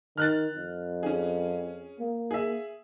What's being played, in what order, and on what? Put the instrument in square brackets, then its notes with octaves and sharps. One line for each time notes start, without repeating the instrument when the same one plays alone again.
[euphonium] D#3 [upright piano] F6 F#6 A6
[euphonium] F2
[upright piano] C#4 G#4
[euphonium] A#3
[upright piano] G#4 E5